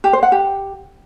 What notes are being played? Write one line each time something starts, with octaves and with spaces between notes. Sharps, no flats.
G4
C5
F#5
G4